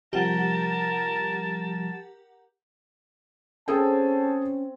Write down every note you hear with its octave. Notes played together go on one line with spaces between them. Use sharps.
C3 F3 G3 G4 A#4 F#5 A5
C4 C#4 G#4 A4 G5 A5